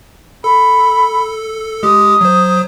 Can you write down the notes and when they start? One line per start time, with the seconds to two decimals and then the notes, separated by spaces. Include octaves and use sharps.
0.44 A4 B5
1.83 G#3 G4 D#6
2.21 F#3 C5